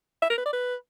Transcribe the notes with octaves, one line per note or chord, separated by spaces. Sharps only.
E5
A#4
B4
D5
B4